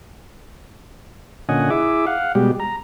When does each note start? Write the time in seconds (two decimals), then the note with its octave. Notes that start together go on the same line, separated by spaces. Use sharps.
1.49 A#2 D3 C#4 D#5 F#5 G#5
1.70 E4 G#4 E5 D6
2.07 F5 F#5
2.35 B2 G3 G#3 G4
2.60 A#5